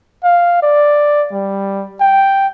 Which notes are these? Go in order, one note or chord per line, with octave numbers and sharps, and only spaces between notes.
F5
D5
G3
G5